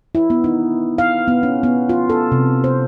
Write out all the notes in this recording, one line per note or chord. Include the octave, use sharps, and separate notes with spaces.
E4
B3
D#4
F5
B3
C#4
B3
F4
A4
C3
C5